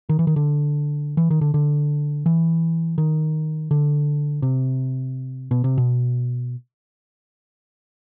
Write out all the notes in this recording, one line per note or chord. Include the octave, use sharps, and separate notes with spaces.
D#3
E3
D#3
D3
E3
D#3
D3
D3
E3
D#3
D3
C3
B2
C3
B2